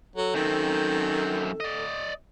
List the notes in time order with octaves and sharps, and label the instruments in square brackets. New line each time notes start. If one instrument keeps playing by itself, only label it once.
[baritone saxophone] F#3 [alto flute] A4
[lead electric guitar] F#2 C4 [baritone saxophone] D#3
[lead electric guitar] D5 D#5